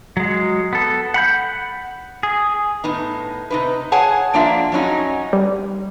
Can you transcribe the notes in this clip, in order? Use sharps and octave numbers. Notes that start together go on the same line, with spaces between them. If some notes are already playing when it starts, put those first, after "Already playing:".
F#3 G#3
B3 A4
F#5 B5 G6
G#4
A2 B3 D#4
C3 D#4 B4
G#4 C#5 F#5 G#5 A5
F3 A#3 D4 F4 D5 E5
F#2 F#3 C#4 D#4
G3